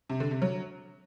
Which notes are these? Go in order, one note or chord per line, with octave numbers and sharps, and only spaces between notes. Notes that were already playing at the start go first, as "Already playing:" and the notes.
C3
D3
C3
F#3